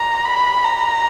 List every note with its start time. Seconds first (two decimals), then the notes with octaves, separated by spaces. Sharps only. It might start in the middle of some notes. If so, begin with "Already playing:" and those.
Already playing: A#5
0.25 B5
0.64 A#5